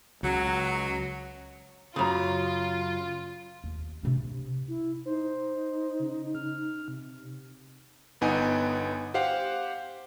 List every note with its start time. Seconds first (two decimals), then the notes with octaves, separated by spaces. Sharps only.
0.23 C#2 F#3
1.96 F#2 C#3 F4 A#5 B5 D#6
3.64 D#2
4.03 C3 D4
4.68 E4
5.05 D#4 C5
6.00 C#3
6.35 F6
6.88 C3
8.21 G1 B3 D#4 F#5 G#5
9.14 G4 C5 F5 F#5